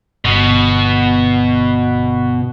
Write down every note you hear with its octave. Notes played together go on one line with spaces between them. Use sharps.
G1 B2